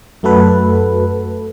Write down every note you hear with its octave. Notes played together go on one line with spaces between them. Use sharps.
F#2 A3 F#4 A4 B4